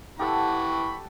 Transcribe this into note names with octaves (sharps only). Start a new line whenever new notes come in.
E3 G4 A4 F#5 B5 C#6